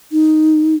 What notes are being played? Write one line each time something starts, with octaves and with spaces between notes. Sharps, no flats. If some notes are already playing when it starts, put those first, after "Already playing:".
D#4